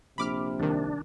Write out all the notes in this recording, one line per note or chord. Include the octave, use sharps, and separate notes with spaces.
A#1 C3 B5 D6 F6
C2 D#3 D4